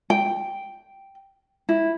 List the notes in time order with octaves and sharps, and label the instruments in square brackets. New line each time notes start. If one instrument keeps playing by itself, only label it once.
[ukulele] G5
E4